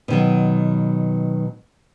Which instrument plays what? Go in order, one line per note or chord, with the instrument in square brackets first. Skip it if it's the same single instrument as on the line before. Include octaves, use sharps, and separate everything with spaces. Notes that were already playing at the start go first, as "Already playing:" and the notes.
[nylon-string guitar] B2 D#3 F#3